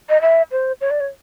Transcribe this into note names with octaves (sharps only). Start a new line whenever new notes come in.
D#5
E5
C5
C#5
D5
C#5